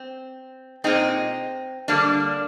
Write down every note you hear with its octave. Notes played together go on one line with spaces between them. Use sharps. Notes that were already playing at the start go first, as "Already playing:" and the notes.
Already playing: C4
A#2 G#3 C4 D#4
D3 G3 A#3 D4